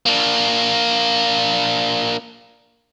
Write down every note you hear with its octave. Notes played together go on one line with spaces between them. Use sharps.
A#3 D4